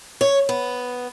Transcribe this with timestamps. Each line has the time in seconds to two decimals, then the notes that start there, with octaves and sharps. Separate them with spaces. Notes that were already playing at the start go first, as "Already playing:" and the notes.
0.21 C#5
0.49 B3